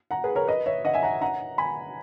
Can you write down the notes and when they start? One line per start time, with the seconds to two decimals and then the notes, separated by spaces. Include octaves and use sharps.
0.11 F#5 A#5
0.24 G#4 B4
0.35 A#4 C#5
0.47 B4 D#5
0.66 C#5 E5
0.85 D#5 F#5
0.94 E5 G#5
1.03 F#5 A#5
1.21 F#5 A#5
1.58 G#5 B5